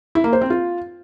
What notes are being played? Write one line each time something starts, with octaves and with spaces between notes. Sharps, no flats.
E4
A#3
C5
C4
F4